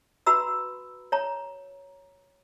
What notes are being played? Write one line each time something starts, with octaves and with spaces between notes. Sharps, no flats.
F#4 B4 A#5 B5 E6
C#5 A#5